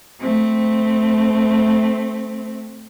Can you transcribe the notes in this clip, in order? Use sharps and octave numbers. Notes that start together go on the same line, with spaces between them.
A3 C4